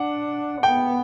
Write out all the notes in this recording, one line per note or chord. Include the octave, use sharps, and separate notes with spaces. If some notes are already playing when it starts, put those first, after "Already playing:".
Already playing: D4 F#5
B3 G5